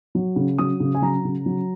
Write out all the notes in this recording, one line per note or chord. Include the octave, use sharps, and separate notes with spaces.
F#3
C#3
F#3 D#6
C#3
G#5
F#3 A#5
C#3
F#3